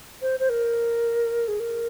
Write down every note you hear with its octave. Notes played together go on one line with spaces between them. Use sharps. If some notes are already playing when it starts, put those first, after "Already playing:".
C5
C5
A#4
G#4
A#4